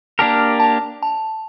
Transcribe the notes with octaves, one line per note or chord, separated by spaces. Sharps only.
A#3 D4 G4 A#4 A5
A5
A5